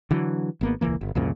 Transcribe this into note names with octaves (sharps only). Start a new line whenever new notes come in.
D3 E3 F#3
G#1 A#3 B3
E1 C#2 E3 A#3
G1
C2 F2 A#2 C#3